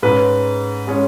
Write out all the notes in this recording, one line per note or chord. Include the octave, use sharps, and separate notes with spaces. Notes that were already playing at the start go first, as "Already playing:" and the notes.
G#2 G#3 C#4 B4
G#3 C#4